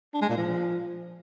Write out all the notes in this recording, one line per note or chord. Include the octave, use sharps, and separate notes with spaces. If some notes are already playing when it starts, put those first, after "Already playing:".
D4
G#3
A#2
F3